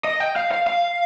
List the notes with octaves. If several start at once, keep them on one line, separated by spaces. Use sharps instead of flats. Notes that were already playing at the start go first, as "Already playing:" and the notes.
D#5
G5
F5
F5
F5